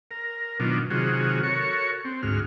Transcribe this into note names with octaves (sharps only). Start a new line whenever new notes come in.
A#4
B2 D#3 F#3 D4 F4
C3 D#3 F#3 F4 F#4 G#4
F#4 A4 A#4 C#5 C#6
C4
D2 G#2 F#4 F6